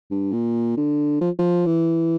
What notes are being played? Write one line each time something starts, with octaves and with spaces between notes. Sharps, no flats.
G2
A#2
D3
F3
F3
E3